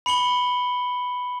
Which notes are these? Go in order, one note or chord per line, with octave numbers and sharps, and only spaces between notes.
B5 C#7 F#7 G7